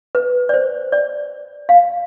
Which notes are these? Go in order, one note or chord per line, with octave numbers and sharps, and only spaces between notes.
B4
D5
C5
D5
F5